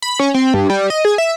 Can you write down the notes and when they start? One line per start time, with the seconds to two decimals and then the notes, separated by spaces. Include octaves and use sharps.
0.02 B5
0.20 C#4
0.34 C4
0.54 G2
0.70 G3
0.90 D#5
1.05 G#4
1.18 E5